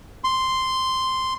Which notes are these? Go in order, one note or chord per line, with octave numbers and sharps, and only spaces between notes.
C6